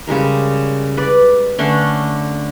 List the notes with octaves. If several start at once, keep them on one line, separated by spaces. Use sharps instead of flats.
C#3 G3 G#3 A#4
B4 D5
D3 A3 C#4 D4